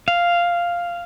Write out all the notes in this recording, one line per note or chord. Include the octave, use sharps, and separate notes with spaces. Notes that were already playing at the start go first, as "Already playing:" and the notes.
F5